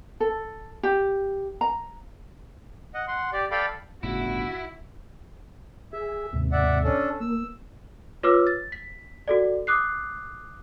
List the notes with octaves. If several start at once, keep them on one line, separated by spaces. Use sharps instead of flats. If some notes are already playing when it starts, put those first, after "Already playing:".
A4
G4
A#5
D#5 F#5
F#5 C6
G4 D5
A4 D5 F5 G5 B5
G1 A2 C#3 E4 F#4
G#4 E5
D#2 G#2 C3
D5 E5 F#5
C#4 D4 A4
A#3 E6
F4 B4 C#5 D6 E6 F6
A6
B6
F#4 A4 D5
D6 D#6 F#6 C7